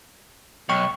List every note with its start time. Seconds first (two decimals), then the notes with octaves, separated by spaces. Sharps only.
0.69 B1 G5 C#6